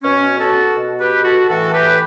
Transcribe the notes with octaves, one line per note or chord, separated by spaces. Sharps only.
B2 C#4
F#4 A4
B2
G4 B4
F#4 A4
A2 E3 F#4 A4
G4 B4